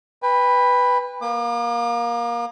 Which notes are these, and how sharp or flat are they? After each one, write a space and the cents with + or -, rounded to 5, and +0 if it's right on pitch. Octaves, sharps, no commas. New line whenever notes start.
B4 +0 G5 +35
A#3 +20 D6 +45